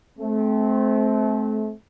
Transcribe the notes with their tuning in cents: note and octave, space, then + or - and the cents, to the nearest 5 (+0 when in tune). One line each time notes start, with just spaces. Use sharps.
A3 -30 C4 +0